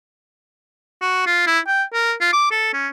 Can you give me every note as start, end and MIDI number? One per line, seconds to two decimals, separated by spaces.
1.01 1.24 66
1.26 1.43 65
1.47 1.59 64
1.67 1.83 79
1.93 2.14 70
2.21 2.31 65
2.33 2.50 86
2.51 2.70 69
2.73 2.88 61